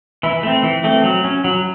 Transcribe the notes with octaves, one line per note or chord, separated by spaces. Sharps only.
E3 E4
A3 C4
E3
A3 C4
F#3
C#4
F#3